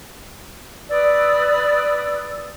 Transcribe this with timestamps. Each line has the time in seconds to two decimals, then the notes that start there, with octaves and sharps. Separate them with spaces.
0.90 B4 D5 D#6 E6